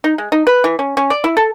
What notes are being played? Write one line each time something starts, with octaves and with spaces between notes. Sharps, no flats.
D#4
G#3
D#4
B4
E3
C#4
C#4
D5
E4
A4